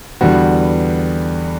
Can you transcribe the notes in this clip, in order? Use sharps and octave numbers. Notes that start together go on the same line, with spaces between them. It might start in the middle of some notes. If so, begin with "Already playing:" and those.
E2 D3 G3 B3 F#4